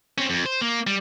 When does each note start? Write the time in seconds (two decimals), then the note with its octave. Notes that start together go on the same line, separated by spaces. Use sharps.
0.18 C4 C#4
0.30 F2
0.46 C5
0.61 A#3
0.87 G3